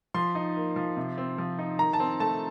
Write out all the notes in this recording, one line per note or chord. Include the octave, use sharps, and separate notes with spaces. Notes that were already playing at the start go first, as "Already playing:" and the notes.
F3 C6
D#4
A#3
F3
C3
C4
F3
D#4
D#3 A#5
A5
C4
A3 A5